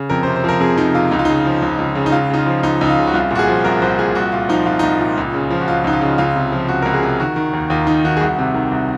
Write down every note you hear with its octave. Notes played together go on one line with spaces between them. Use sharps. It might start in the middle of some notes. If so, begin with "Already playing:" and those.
Already playing: C#3
F2 A#4
C3 C5
C5
F3 A#4
F2 G#4
F2 D#4
C3 F4
C#2 D#4
F4
C#3 D#4
F3
C#2
C#2
C#3
D#4
C#2 F4
C#3 D#4
F4
F3
C#2 D#4
C#2 D#4
F4
C#3
F#4
C2 F4
A#2 F#4
G#4
F3
C2 A#4
C2 C5
A#2 G#4
C2 F#4
A#2 F4
F3 D#4
C2 F4
C2 D#4
F4
A#2
C#2
C#3
F3
F#4
C#2 F4
C#2 D#4
F4
C#3
C#2 F4
C3
F3
C#2 F#4
C#2 A#4
G#4
C3
D#3 F#4
D#3
D#2
D#2 F4
D#3 D#4
D#3 F#4
G#4
C2 F#4
C3
D#3
C2